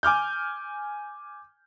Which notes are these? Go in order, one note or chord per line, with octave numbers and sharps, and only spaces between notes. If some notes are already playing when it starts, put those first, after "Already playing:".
G#5 D6 F6 G6